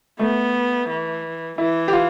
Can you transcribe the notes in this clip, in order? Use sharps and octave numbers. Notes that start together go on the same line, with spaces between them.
A3 B3
E3
E3 E4
G4
F4